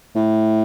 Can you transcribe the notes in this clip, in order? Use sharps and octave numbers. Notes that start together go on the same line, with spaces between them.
A2